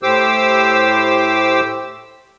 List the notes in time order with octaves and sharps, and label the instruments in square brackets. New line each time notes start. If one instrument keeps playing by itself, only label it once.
[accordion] A2 G4 C5 D6 E6